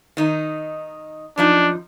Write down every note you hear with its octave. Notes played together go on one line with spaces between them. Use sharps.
D#3 D#4
F#2 F3 D4 D#4